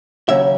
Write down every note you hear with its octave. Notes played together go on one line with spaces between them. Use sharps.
D#2 C#3 F#3 C#4 E5